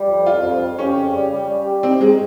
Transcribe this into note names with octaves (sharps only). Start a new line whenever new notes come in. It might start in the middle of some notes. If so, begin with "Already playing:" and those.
Already playing: G3
F2
F2 F4
F2
F2
C#4 G4
C#3
G3
G3
G3
G4
C4 D#4
G#2 G#3